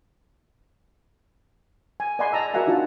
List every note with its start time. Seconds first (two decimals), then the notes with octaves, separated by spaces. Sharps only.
2.00 G#5
2.19 D5 D#5 F#5 G#5 B5 C6
2.33 D#5 A5 A#5 E6
2.54 F#4 A#4 D5 E5 F#5 G#5
2.67 D4 D#4 F4 F#4 A5